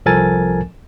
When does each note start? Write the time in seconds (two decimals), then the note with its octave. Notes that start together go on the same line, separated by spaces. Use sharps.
0.06 C2 F3 A4 A#4 G#5 A6